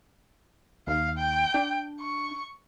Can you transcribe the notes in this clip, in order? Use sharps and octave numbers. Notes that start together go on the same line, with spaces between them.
D#2 F5
G5
D4
C#6